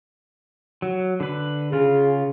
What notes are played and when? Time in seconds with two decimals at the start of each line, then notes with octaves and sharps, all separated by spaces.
0.82 F#3
1.20 D3 B4
1.72 C#3 F4 G#4